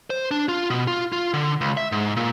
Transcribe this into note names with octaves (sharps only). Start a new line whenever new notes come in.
C5
D4
F4
B2
F4
F4
D3
C#2
E5
G#2
A#2